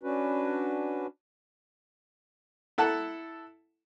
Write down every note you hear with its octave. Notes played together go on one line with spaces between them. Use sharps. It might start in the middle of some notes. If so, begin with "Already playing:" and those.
C#4 D4 F#4 B4
E4 A4 F#5 A5